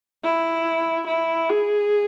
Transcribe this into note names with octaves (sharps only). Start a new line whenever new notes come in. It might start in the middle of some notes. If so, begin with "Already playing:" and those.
E4
E4
G#4